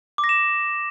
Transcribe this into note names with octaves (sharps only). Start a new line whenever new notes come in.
D6
A#6
E7